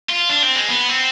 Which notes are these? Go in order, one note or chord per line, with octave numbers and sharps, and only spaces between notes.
F4
D4
C4
G#3
B3
C4